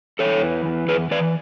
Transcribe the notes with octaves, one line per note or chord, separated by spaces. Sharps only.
E2 A4 C#5
E3
E2
E2 G#4 B4
E3 B4 D5